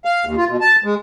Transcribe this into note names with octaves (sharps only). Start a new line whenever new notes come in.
F5
D#2
F4
B2
A5
G#3